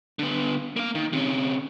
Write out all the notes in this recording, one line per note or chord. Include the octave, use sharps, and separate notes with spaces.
D3 B3
A#3 F5
D#3
C3 C#4